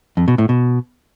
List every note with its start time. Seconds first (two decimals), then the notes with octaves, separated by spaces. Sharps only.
0.17 F2
0.28 B2
0.38 A2
0.49 B2